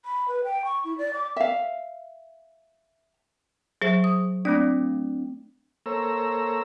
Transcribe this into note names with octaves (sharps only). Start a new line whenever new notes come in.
B5
B4
G5
C#6
E4
D5
D6
E5 F5
F#3 G#4 C5 E5
D#6
A3 C4 D4 D5
A#3 A4 C5 C#5 A#5 E6